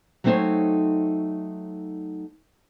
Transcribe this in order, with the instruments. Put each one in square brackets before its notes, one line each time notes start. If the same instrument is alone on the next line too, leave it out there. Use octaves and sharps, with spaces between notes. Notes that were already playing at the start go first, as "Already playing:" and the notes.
[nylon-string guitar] F#3 A3 C4 D#4 C5 C#5